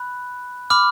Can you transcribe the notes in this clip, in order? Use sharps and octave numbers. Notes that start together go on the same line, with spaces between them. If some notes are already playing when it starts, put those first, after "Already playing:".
Already playing: B5 F#6
B5 D6 F6